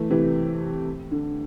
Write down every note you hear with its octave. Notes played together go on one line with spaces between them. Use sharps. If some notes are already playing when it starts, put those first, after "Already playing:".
Already playing: E3 A3
C3 E3
D3